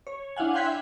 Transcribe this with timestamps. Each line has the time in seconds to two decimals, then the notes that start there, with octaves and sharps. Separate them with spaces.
0.07 C#5
0.36 D4 E4 F5 F#5 G#5
0.54 F5 G5 C6 F#6 G#6 B6
0.66 E5